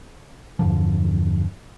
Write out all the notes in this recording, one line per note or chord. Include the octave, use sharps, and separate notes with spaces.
E2 G2 D3 F3